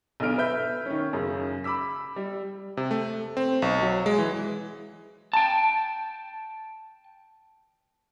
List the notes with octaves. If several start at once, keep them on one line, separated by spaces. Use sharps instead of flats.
B1 E2 D3 F6 D7
B4 E5 G6
D#3 C#4
F#2 C#3
B5 D6 E6 B6
G3
C3
A3
C4
B1
F#3
G#3
E3
G5 A5